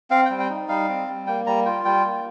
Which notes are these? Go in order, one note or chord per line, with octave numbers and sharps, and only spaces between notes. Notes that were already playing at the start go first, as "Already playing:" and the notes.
C4 F5
G3 G5
G5
D#4
G3 F5
C4
G3
A#3 G5
G3 A#5
F4 G5
G3 G5
A#3